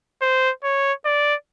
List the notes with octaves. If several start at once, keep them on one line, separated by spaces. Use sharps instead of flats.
C5
C#5
D5